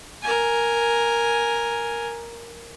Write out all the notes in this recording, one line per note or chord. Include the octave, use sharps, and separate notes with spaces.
A#4 G#5